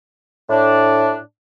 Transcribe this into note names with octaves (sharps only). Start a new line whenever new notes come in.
A2 D4